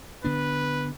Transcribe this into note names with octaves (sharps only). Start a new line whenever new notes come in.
D3 B3 D4 B4